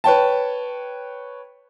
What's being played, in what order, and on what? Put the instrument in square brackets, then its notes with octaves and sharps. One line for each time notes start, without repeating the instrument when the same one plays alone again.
[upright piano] B4 C#5 G5 A5